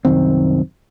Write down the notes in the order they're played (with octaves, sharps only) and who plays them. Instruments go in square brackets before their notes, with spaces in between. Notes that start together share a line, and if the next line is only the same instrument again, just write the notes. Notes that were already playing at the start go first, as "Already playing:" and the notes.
[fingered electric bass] C2 F#2 D#3 C4